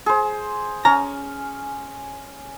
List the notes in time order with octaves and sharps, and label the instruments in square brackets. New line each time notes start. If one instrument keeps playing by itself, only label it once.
[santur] G#4 C5
[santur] C#4 [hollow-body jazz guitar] A#5